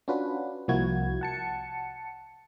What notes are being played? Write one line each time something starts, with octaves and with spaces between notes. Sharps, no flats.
C#4 D4 F4 F#4 B4
C2 F3 A#3 E4 F#4 G#6
F#5 A5 C#7